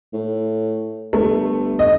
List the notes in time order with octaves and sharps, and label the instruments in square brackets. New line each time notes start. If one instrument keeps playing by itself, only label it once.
[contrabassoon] A2
[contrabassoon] G1 [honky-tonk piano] A3
[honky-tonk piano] D#5